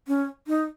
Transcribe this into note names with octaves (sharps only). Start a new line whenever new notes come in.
C#4
D#4